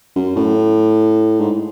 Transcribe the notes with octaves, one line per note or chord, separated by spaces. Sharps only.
F#2
A2
G#2